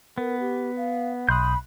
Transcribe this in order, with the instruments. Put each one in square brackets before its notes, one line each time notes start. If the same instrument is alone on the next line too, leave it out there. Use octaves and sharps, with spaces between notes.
[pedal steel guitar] B3 [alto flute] A#4
[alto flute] G4
F5
[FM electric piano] B1 C6 F#6 [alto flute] B5 [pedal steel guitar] D#6 G6